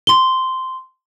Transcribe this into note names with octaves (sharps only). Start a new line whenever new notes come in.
C6 G7